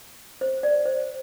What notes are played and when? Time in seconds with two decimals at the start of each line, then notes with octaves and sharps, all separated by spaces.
0.41 C5
0.63 D5
0.85 C5